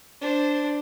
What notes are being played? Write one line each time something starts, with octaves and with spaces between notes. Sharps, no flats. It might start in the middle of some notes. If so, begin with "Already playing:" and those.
D4 C5